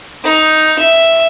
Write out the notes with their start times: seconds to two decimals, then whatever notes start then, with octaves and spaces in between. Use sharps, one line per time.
0.24 D#4
0.79 E5